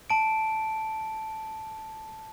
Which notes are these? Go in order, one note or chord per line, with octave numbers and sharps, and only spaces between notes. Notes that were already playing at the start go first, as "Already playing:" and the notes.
A5 D7